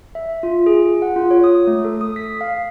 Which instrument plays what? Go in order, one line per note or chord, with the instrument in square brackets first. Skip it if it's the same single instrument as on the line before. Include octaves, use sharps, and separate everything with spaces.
[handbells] E5
F4
G#4
F#5
F4
C#5
D#6
A3
A4
D#6
B6
F5